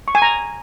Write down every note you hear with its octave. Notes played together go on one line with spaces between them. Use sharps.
C#6
G#5
A#5